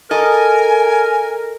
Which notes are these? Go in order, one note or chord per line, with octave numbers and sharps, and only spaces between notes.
A4 A#4 D#5 G#5